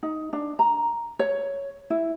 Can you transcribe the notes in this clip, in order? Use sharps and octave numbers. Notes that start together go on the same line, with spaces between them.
D#4
D4
A#5
C#5
E4